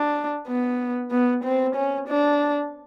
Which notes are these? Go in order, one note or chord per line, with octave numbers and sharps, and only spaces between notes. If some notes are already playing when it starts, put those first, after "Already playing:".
Already playing: D4
B3
B3
C4
C#4
D4